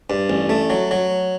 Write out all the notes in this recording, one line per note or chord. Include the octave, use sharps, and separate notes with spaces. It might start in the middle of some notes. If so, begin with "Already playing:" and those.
G2
A1
A3
F#3
F#3